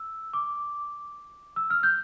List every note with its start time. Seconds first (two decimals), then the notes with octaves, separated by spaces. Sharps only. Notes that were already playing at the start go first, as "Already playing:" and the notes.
Already playing: E6
0.33 D6
1.56 E6
1.70 F6
1.83 G6